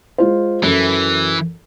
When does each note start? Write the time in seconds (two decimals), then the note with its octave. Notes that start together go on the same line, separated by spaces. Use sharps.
0.18 G#3 F4 C5
0.63 F#2 E3 A4